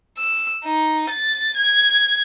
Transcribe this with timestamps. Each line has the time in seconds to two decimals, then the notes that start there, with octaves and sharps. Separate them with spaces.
0.18 E6
0.65 D#4
1.09 A6
1.57 G#6